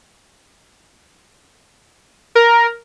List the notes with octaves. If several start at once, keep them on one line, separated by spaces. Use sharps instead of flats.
A#4